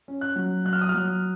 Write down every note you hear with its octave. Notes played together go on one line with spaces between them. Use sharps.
C#4
F#6
F#3
F#3 F#6
F6
D#6
F6
F#3